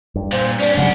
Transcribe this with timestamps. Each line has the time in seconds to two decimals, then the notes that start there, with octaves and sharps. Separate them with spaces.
0.16 G2
0.32 A#2 C5
0.60 C#4 D4 D5
0.77 C#3 F#3 G#3 F#5